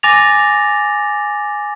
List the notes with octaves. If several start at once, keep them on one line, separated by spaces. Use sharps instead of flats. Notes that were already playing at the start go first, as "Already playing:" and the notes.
G#5 D6 A6 A#6 F7